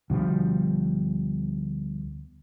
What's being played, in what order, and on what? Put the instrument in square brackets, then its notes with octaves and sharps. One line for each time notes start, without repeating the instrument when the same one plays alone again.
[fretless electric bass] D2 B2 F3 G3